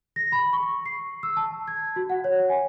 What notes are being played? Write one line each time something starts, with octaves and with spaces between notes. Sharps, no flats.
A#6
B5
C#6
C7
E6
A5
G#6
F#4
F#5
C#5
G#5